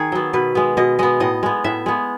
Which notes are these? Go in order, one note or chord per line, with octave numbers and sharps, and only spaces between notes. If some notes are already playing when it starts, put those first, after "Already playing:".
Already playing: D#3 G#4
F#3 B3
B2 B4
G#3 B3
B2 D#5
G#3 B3 D#5
A2 D#5
G#3 B3
A2 E5
G#3 B3